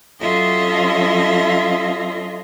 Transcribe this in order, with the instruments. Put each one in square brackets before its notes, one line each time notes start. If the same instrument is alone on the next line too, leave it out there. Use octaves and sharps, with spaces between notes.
[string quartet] F#3 C#4 F4 A4 D#5 E5